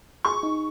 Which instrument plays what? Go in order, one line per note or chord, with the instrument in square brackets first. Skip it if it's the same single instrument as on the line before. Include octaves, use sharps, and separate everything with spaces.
[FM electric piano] G#4 [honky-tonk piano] C#6
[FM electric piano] D#4